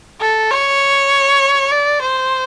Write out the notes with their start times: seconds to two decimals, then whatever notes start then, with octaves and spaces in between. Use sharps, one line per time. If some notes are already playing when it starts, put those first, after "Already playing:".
0.21 A4
0.51 C#5
1.71 D5
2.01 C5